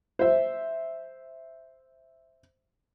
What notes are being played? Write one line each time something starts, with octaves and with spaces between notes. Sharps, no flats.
C5 E5